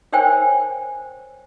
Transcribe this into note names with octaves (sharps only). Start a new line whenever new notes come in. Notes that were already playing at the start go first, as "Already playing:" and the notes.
A#4 C5 C#5 G5 G#5